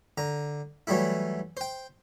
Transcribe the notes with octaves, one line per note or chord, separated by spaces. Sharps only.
D3 A#5
E3 F#3 G3 A3 E4
C5 G5